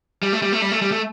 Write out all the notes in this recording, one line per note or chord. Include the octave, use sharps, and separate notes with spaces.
G3
A3
G3
A3
G3
A3
G3
A3